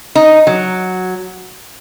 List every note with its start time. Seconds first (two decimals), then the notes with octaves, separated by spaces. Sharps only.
0.15 D#4
0.47 F#3